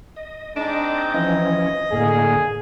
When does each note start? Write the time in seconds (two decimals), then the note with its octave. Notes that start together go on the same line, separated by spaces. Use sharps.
0.16 D#5
0.56 G#3 C4 D4 D#4 D#5 D6
1.14 E3 F3 C#4 D#5
1.92 A2 D3 A#3 G#4